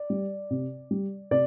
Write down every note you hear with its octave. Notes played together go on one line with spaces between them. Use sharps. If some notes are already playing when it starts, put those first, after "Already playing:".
Already playing: D5
G3
C3
G3
C3 D5